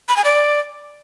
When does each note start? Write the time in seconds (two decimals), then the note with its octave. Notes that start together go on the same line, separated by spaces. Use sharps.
0.09 B5
0.17 G#5
0.25 D5